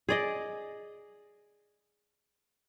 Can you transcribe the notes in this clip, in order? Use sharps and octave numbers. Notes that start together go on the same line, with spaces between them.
G#4 D5 D#5